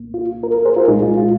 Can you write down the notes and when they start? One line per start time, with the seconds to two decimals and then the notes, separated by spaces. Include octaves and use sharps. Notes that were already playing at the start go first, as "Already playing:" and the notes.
Already playing: C2 A#2 A#3
0.14 F4
0.43 F4 A#4
0.55 A#4
0.65 G#4 C5
0.76 F4 A#4
0.88 C2 A#2 G#3 D#4 G#4
1.02 F4
1.17 F4